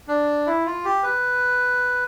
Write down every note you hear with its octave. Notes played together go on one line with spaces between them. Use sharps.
D4
E4
F4
G4
B4